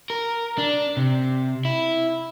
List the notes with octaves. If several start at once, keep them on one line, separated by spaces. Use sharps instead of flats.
A#4
D4
C3
E4